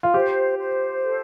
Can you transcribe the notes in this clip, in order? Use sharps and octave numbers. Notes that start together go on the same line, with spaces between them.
F4
G4 C5
C5
A4